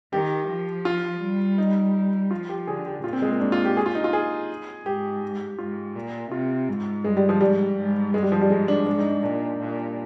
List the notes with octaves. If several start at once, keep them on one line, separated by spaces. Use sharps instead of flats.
D#3 G4
F3
F4
G3
D#4
F3 F4
G4
D3 G#4
G4
A#2 F4
C4
G#3
A#3
G#2 D4
F4
G4
G#4
F4
D#4
F4
G#4
G#2 G4
G#2 F4
A#2
C3 F4
G#2
G2 G#3
G3
F3
G#2 G3
G#2
G2 G#3
G3
F3
G3
G#2 G#3
D4
G#2 D4
D#4
D#4
A#2 D4
A#2